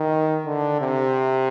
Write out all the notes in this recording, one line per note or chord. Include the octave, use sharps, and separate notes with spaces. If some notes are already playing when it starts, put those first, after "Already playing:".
Already playing: D#3
D3
C3